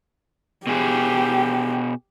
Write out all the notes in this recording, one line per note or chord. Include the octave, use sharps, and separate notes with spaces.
B2 G4 G#4